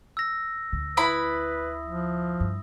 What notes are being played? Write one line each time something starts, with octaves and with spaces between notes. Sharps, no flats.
E6 A#6
D2 D3
E4 B4 B5 D#6
F3
G2